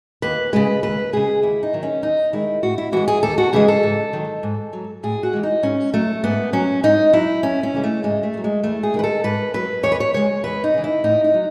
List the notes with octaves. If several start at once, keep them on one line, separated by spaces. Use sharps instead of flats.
D#2 B4
C#3 G#3 B4
D#2 B4
C#3 G#3 G#4
D#2 E4
D#4
D#3 F#3
C#4
D#2 D#4
D#3 G#3 E4
A2 F#4
E4
E3 G#3 F#4
G#4
D#2 A4
F#4
C#3 E3 G#3 G#4
A4
G#2
D#3 F#3
G#2
F#3
A2 G#4
F#4
E3 G#3
D#4
G#2 C#4
F#3 A3
G#2 B3
F#3 C#4
G#2 D#4
F#3 E4
F#2 C#4
C#4
C#3 E3 G#3
A3
G#2 G#3
A3
D#3
F#3
G#3
E2 A3
G#4
D#3 G#3 B4
A4
G#2 B4
F#3 B4
E2 C#5
B4
C#5
C#3 G#3 C#5
E2 B4
D#4
C#3 E3
E4
A2 D#4
D#4
F#3